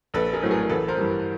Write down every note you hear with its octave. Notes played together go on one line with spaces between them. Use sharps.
A#1 A4 B4
G#4 A#4
A2 F#3 A3
G#4 A#4
A1 A4 B4
A#4 C5
G2 E3 G3